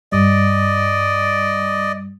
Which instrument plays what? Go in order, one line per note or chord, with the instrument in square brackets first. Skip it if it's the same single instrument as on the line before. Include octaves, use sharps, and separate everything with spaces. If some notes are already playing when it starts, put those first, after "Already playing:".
[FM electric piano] G2 G3 [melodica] D5 D#5